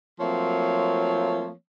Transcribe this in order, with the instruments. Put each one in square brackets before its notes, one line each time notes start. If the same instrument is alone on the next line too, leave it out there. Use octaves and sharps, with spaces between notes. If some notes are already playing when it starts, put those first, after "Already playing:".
[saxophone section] F3 F#3 A3 A#3 C4 C#5